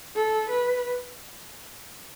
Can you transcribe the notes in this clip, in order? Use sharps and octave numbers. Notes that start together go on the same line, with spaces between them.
A4
B4